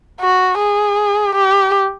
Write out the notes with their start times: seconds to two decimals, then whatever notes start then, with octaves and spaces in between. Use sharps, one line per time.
0.21 F#4
0.59 G#4
1.35 G4